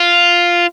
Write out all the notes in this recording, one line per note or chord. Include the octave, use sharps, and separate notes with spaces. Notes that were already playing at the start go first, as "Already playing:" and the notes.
Already playing: F4